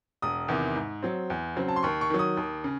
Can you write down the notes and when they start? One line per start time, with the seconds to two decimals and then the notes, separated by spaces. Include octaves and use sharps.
0.22 E1 D#6
0.48 E2 C3 D#3
0.76 G#2
1.03 F#3 C4
1.30 E2
1.56 C#3 F#3 C4
1.68 A5
1.76 C6
1.83 D#2 C#6
2.01 C#6
2.10 D#3 F#3
2.19 D#6
2.37 D#2
2.64 C#3